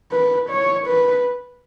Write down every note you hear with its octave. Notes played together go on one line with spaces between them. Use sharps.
B4
C#5
B4